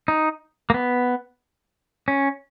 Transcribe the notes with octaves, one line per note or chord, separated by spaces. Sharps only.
D#4
A#3
B3
C#4